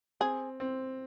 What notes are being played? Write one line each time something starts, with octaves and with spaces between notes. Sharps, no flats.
C4 G#4
C4